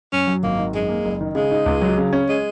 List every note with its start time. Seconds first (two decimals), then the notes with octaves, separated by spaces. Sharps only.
0.12 F#2 C#4
0.27 F#3
0.43 G#1 A#3
0.58 D#3
0.74 F#2 G#3
0.89 A#3
1.05 F#1
1.21 D#3
1.35 C#3 G#3
1.51 D#4
1.66 C#2
1.82 F#3
1.98 C#3
2.13 C#4
2.29 G#3